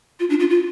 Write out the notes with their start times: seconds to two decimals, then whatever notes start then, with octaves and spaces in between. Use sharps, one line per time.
0.20 F4
0.30 D4
0.40 F4
0.50 F4